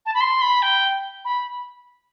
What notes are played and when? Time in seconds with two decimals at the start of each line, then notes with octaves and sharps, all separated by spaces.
0.06 A5
0.14 B5
0.21 C6
0.42 B5
0.62 G5
1.25 B5